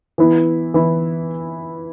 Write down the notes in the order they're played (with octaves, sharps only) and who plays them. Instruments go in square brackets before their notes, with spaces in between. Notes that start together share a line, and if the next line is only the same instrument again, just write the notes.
[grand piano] E3 B3 E4
E3 B3 E4